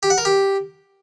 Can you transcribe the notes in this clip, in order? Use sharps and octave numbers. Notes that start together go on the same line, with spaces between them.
G4
F#5
A#4
G4